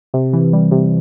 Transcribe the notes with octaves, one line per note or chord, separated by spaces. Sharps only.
C3
E3
G3
C3